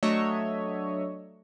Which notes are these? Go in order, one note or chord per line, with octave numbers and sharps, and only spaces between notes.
F#3 A3 D4 C#5 D#5 E5